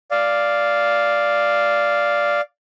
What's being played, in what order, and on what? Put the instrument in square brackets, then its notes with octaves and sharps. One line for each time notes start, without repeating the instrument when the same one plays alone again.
[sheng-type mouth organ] D5 F5